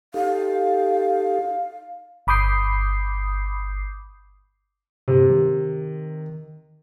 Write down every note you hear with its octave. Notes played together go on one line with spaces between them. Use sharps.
D#4 G4 A4 F5
G1 B5 D6 D#6 G6 C7
G2 C3
D#3